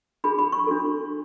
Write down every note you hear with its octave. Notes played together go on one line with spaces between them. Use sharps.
D4 F4 G#4 B5
B5
C#6
D4 F#4 A4